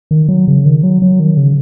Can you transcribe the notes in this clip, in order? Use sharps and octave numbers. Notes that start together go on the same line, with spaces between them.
D#3
F#3
C#3
D#3
F#3
F#3
D#3
C#3